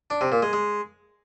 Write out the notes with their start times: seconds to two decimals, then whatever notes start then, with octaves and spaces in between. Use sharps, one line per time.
0.10 D4
0.21 C3
0.32 A#2
0.42 G#3
0.53 G#3